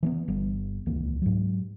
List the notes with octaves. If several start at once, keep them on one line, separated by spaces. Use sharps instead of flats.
E3 A#3 B3
G1 G3 B3
D#1 C#2 E3 A#3
G#2 F#3